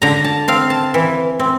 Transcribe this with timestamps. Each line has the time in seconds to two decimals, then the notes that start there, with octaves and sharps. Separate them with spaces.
0.02 D3 A#5
0.24 A5
0.48 C4 F5
0.70 A5
0.94 E3
1.39 C4